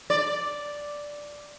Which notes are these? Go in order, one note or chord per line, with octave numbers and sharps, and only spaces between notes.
D5